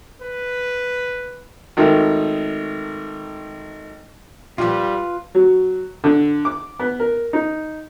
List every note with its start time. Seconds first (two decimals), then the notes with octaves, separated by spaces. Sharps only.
0.21 B4
1.77 G#1 D#3 A3
4.58 A#2 F3 G3 F4 B4
5.35 F#3
6.04 D3
6.45 D6
6.79 B3
7.00 A#4
7.33 D#4